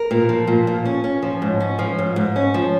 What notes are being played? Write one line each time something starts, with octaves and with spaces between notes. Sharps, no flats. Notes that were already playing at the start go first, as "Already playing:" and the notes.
Already playing: A#4
A#2
F3
A#2
A#2
C#4
C#4
F3
G#2
C#4
F3
G#2
G#2
C#4
F3